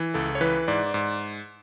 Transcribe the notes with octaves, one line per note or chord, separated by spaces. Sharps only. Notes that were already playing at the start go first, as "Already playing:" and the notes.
Already playing: E3
C#2 A4
C#5
E3 B4
G#2 D5
G#2